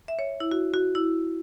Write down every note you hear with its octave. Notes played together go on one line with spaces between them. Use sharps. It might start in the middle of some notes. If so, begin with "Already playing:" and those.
E5
C#5
E4
F#4
F#4
E4